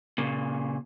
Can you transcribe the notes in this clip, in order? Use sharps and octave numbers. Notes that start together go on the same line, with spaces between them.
A#2 C#3